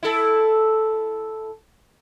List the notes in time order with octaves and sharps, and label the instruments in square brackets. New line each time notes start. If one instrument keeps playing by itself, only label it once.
[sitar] E4 A4